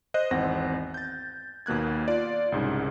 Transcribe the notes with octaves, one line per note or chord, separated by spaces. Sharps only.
C5 D#5 F#6
G#1 E2 C4 F#5 A#6
G6 A6
D#2 B2 A#3 F#6 G#6
F4 D5
C2 G#2 C#3